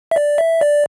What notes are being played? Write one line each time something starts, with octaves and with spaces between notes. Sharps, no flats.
E5
D5
E5
D5